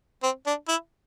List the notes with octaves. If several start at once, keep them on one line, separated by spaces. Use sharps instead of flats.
C4
D4
E4